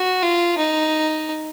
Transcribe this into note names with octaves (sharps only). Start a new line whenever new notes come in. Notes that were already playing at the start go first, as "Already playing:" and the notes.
Already playing: F#4
F4
D#4